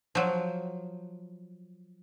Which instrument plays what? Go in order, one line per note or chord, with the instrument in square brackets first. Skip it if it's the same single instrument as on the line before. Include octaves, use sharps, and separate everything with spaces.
[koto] F3 F#3